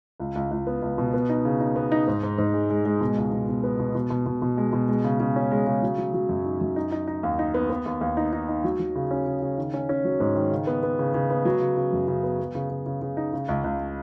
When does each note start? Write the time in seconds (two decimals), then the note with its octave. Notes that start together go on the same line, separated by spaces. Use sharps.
0.20 C#2
0.35 C#2
0.51 C#2
0.67 B3
0.82 C#2
0.98 B2
1.14 B3
1.29 D#4
1.45 C#3
1.60 D#4
1.76 B3
1.92 D#4
2.08 G#2
2.23 G#2
2.38 G#2
2.54 G#3
2.70 G#3
2.86 G#3
3.01 B2
3.17 C#2
3.32 B2
3.48 B2
3.64 B3
3.79 B2
3.95 B2
4.10 B2
4.26 B2
4.42 B2
4.57 G#3
4.73 B2
4.89 G#3
5.04 C#3
5.20 C#3
5.36 C#4
5.51 G#3
5.67 C#3
5.82 F#3
5.98 F#3
6.14 F#3
6.29 F#2
6.45 D#4
6.61 F#2
6.76 D#4
6.92 D#4
7.07 D#4
7.23 D#2
7.39 D#4
7.54 B3
7.70 B3
7.86 D#2
8.01 D#2
8.17 D#4
8.33 D#4
8.48 D#4
8.64 F#3
8.80 F#3
8.95 C#3
9.11 C#4
9.27 C#3
9.42 C#3
9.58 D#3
9.74 C#4
9.89 C#4
10.05 F#3
10.20 G#2
10.36 D#3
10.51 C#3
10.67 B3
10.83 B3
10.99 C#3
11.14 C#3
11.30 B3
11.45 F#3
11.61 C#3
11.77 C#3
11.93 F#2
12.08 C#3
12.23 B3
12.39 B3
12.55 C#3
12.70 C#3
12.86 C#3
13.02 C#3
13.17 D#4
13.33 C#3
13.49 C#2
13.64 C#2